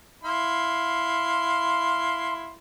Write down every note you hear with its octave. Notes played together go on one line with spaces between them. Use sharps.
E4 F5 C6